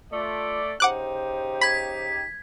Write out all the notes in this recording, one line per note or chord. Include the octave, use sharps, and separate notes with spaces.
A3 F4 D5
C#3 D#4 G4 C5 F#5 D6 F#6
B5 G#6 B6